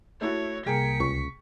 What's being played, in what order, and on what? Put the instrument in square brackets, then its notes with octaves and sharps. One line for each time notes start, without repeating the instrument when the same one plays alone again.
[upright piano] A3 E4 F#4 [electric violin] C#5
[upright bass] C2 [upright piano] A#3 G#4 G5 [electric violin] B6 C#7
[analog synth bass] C#2 [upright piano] C#6